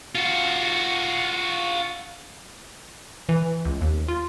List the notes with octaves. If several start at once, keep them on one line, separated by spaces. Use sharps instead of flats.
F4 F#4
E3
C#2
D#2
F4